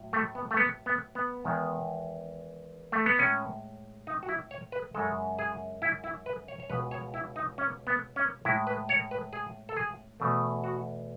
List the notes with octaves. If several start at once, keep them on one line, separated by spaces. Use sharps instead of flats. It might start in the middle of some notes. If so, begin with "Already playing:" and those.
Already playing: A2 F#3
A3
B3
A3
B3
B3
B3
E2 D#3 G#3
A3
B3
A2 G#3 C#4
D#4
F#4
E4
C#5
B4
F#2 C#3 G#3 A4
G#4
E4
E4
B4
C#5
C#5
C#2 B2 G#3 B4
C#5
E4
D#4
C#4
B3
C#4
A2 G#3 E4
B4
C#5
B4
G#4
A4
G#4
E2 B2 A3
F#4